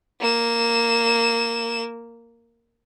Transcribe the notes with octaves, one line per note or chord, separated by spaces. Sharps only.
A#3 E7